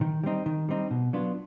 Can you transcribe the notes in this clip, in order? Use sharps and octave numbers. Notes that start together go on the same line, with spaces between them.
D#3
G3 C4 D#4
D#3
G3 C4 D#4
B2
F#3 B3 D4 F4